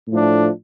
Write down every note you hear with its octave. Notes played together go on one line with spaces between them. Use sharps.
A2 F3 A3 D4